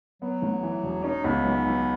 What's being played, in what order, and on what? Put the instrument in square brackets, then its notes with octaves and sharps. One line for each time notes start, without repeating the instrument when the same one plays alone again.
[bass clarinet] F#3 [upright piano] B3
[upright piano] A1
E3
E1
[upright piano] C#4 [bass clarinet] D#4
[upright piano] C#2 [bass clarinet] B3
[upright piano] B1
B1